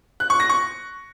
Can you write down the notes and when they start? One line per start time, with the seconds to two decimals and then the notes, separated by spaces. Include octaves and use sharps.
0.20 F#6
0.30 C#6
0.40 A#6
0.49 C#6